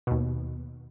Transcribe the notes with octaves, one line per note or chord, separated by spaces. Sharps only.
D#2 B2